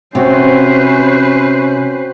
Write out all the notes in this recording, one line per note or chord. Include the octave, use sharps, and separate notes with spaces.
C3 C4 C#4 F#4 B4 C5